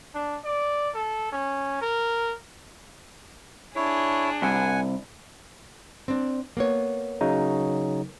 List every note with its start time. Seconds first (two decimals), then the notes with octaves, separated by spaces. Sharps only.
0.15 D4
0.44 D5
0.94 A4
1.32 C#4
1.81 A#4
3.75 D4 E4 G#4 C#5
4.42 C2 F#5 G#5
6.08 C4 D4
6.57 A#3 B3 C#5
7.21 C#3 F#3 D#4